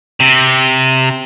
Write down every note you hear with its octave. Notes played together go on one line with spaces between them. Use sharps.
C3